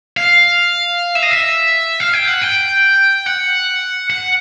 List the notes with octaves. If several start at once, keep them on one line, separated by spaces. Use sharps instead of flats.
F5
E5
D#5
E5
F5
G5
F#5
G5
F#5
F#5